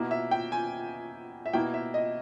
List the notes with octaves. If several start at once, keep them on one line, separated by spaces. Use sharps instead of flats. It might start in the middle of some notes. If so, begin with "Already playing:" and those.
Already playing: B2 A#3 E4
E5
G5
G#5
E5
B2 A#3 E4 G5
E5
D#5